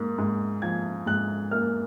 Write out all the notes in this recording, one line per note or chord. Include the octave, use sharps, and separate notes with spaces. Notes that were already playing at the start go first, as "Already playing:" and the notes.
Already playing: G#2 A#3
G#2
F3 G#6
G#2 F#6
A#3 F6